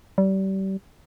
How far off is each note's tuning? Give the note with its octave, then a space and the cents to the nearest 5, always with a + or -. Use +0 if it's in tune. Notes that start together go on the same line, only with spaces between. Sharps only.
G3 -30